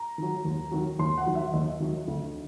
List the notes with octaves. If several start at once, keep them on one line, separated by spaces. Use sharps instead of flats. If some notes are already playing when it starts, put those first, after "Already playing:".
Already playing: A#5
D#3 F#3
D#2
D#3 F#3
D#2 C6
F#5
D#3 F#3
E5
D#2 D#5
D#3 F#3
D2